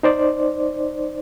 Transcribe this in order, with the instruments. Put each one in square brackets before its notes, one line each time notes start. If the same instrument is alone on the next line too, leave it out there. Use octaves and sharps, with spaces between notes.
[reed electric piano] D#4 C5 D5